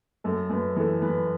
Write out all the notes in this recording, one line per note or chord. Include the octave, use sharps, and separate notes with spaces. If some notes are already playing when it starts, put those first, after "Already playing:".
F#2 A4
F#2 B4
E3 A4
E3 B4